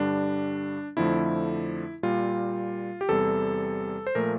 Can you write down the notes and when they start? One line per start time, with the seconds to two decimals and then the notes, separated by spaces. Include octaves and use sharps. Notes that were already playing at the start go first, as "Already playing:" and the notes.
Already playing: G2 D3 G3 D4
0.97 F2 D3 F3 A3 E4
2.03 A#2 G3 F4
3.01 G4
3.09 E2 C3 G3 A4
4.07 C5
4.15 A#2 F3 A3 A#4